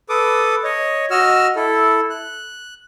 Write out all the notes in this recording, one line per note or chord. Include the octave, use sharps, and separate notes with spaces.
A4 B4 D6 D#6
C#5 D#5
F#4 D#5 E6 F6
E4 A4
F#6